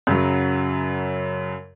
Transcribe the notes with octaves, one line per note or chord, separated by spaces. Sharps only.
F#2 C#3 F#3